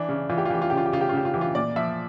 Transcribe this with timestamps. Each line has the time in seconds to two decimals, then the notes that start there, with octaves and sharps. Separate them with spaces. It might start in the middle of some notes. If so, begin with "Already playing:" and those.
Already playing: E3 D4
0.09 C#3
0.29 E3 F4
0.38 G4
0.45 F4
0.50 E3 G4
0.62 F4
0.70 C#3 G4
0.77 F4
0.86 G4
0.92 C#3 F4
1.01 G4
1.09 F4
1.13 C#3 G4
1.25 F4
1.34 E3 G4
1.41 F4
1.55 A#2 D5
1.76 F3 E5